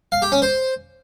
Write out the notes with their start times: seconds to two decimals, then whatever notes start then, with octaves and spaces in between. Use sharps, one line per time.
0.12 F5
0.22 G4
0.32 C#4
0.42 C5